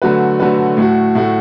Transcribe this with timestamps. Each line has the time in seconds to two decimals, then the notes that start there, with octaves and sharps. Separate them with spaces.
0.02 D3 F#3 A3 F#4 B4
0.40 D3 F#3 A3 F#4 B4
0.77 A2 A3 F#4
1.15 A2 A3 F#4